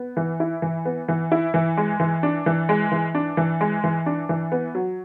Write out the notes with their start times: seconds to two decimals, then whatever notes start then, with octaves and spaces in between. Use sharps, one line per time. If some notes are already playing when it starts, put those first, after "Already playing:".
Already playing: B3
0.17 E3
0.40 E4
0.62 E3
0.85 B3
1.08 E3
1.32 E4
1.54 E3
1.77 G#3
2.00 E3
2.23 D4
2.46 E3
2.69 G#3
2.92 E3
3.15 D4
3.37 E3
3.61 G#3
3.84 E3
4.06 D4
4.29 E3
4.52 B3
4.75 F#3